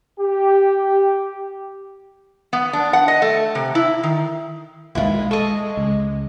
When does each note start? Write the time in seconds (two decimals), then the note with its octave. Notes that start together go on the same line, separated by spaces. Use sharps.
0.19 G4
2.53 B3
2.73 D4
2.93 F#5
3.08 D#5
3.22 A3
3.55 C3
3.75 E4
4.03 D#3
4.95 A#1 D#2 B2 G#3 E4 F4
5.31 A4 D#5 C#6
5.77 C#2